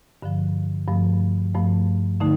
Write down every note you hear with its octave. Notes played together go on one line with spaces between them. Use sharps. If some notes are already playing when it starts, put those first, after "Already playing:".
G2 D3 F3
G2 F3 A3
G2 F3 A3
D3 A3 D#4